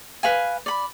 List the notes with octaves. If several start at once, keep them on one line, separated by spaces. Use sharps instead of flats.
B4 F5 G#5
D5 B5